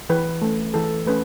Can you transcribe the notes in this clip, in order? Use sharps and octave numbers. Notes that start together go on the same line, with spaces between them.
E3 B4
A3 C#4
E3 A4
A3 C#4 B4